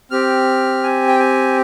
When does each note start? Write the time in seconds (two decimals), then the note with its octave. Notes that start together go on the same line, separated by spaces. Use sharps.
0.11 C4 G4 F6
0.84 G#5
1.08 G5
1.19 G#5